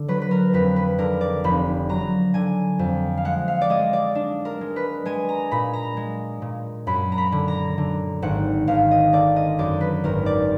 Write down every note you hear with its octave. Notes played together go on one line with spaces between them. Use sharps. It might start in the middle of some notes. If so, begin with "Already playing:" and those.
Already playing: D3
F#3 B4
B4
A#4
F2 B4
B4
D3 A#4
D5
F1 B5
F#3 A#5
D3 G#5
F2
F5
G#3 F#5
F5
D5
G#3 D#5
D5
D4
A#4
G#3
B4
G#3 G#5
A#5
A#2 B5
A#5
G#3
A#2
F#2 B5
A#5
B5
D3
A#5
D3
G#1 F#5
G#1 F5
D#5
D3 D5
D#5
F#2 D5
B4
G#1 A#4
D5